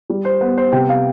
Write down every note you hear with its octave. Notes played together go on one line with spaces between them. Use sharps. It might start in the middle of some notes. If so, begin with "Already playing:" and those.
G3
C5
B3 B4
C5
C3 G5
F5